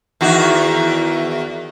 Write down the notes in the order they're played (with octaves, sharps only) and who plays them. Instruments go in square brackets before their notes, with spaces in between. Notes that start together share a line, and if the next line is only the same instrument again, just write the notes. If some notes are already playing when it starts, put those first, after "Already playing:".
[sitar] E2 D#3 F#4